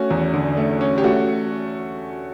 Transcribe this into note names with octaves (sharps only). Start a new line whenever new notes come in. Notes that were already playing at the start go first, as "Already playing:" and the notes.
Already playing: A3 C#4 F#4
E2
D3
A3
C#4
G4
A3 F#4